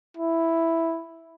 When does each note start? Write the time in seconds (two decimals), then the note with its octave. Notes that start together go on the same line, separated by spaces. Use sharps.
0.17 E4